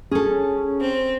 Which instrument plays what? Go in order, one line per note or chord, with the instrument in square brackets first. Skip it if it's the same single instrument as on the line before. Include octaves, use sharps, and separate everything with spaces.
[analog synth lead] C#4 [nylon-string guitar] G#4 A4
[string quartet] C4